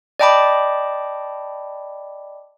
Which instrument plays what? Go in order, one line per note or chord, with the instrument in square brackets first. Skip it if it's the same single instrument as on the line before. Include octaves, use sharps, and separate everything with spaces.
[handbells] D5 D#5 G5 A5 B5 D6